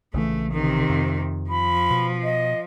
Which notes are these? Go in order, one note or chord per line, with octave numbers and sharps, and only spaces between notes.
A#1 C#3 E3 A3
C3 D#3
F2
F3 B5
B2
D#5